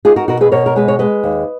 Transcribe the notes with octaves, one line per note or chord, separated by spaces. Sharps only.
D#4 F4 G#4
F#4 A#4
B2 F#4 A#4
G#4 B4
B2 A#4 C#5
A#4
G#3 B4
C#5
G#3 B4 D#5
D#2